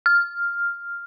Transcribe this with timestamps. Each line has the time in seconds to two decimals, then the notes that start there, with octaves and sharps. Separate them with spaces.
0.06 F6